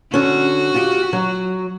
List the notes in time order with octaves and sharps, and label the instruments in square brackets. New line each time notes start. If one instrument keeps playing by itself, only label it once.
[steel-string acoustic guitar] D3 C#4 [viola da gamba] F#4
[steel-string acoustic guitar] F4 G4
F#3